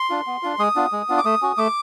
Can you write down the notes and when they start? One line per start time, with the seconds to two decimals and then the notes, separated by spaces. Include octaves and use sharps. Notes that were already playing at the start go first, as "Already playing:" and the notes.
Already playing: C6
0.10 D4 F4
0.27 B3
0.43 D4 F4
0.59 G#3 D#6
0.76 B3 D4 F4
0.92 G#3
1.09 B3 D4 F4
1.18 D6
1.25 A3 D#6
1.42 C#4 F#4
1.58 A3 D6